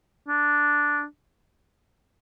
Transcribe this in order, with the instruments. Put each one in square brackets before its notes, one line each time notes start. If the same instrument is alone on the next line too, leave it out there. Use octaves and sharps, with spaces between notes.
[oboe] D4